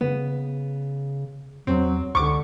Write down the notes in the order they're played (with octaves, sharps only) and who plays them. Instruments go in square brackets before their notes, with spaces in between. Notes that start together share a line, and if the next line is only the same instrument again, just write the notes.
[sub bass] C#3 [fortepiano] B3
[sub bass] E2 [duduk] F#3 [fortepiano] C4
[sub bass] C#2 [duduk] D3 [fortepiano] C#6 D6